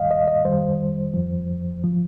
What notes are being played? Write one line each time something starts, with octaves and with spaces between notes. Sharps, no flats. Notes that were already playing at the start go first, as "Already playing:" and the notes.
Already playing: D#2 D#3 G3 D#5 F5
D#5
D#5
F2 D#3 G3 C5
F2 F3
F3